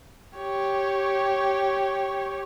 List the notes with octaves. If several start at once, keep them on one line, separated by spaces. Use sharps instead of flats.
G4 C#5